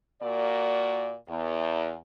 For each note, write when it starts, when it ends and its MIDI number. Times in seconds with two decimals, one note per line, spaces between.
0.23 1.15 46
0.23 1.15 58
0.23 1.15 66
0.23 1.15 74
1.29 1.97 40